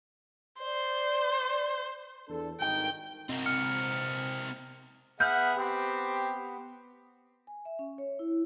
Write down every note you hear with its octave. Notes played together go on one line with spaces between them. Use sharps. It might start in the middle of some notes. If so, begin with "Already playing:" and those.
C5 D5
E2 D4 A4
G#1 G2 D#3 G5
C3 C4 A#4 D#5
F6 C#7
B3 G#4 E5 F#5 F6 G6
C4 G4
G#5
E5
C#4
C#5
E4